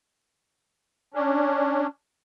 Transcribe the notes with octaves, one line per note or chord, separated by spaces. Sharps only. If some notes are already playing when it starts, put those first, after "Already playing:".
C#4 D4